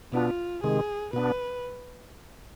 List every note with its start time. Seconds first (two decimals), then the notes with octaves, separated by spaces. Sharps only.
0.12 B2 B3 D4 F4
0.63 C3 D#3 G#3 G#4
1.13 B2 B3 D4 B4